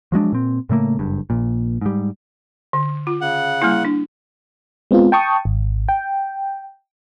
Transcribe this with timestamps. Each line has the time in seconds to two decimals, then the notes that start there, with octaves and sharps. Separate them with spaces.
0.12 F3 F#3 G#3 D4
0.33 A#2 C4
0.69 A2 C#3 A3 A#3
0.99 F#1 G2
1.30 A#1 A#2
1.81 G#2 G3
2.73 D3
3.07 F4
3.21 C#3 F#5
3.62 G3 A#3 E4
3.85 D4
4.91 G#3 B3 C4 F4
5.12 G5 A5 C#6 D#6
5.45 G#1
5.89 G5